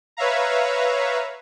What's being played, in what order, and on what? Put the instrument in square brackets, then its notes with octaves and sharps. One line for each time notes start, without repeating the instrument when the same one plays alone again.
[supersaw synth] B4 C#5 E5 F5 A#5